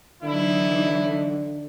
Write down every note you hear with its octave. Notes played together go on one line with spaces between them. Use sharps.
D3 E3 F#3 D#4 E4